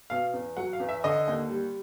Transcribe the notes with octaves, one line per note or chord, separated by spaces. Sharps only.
B2 F5
E2
F#3 F#5
F5
E2
E5
D3 D#5
D#2
G3